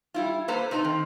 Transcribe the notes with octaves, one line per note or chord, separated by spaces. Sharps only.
G3 E4 F4
A#3 A4 B4 C5 A#5
C3 A3 D#4 A#4 A#5
D#3 C4